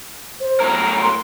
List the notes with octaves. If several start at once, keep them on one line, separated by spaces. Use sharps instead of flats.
C5
A2 F#3 A#4 A#5
C6